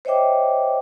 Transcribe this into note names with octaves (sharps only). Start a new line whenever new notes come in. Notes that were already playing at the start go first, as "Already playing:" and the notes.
C5 C#5 D#5 E5 G5 D6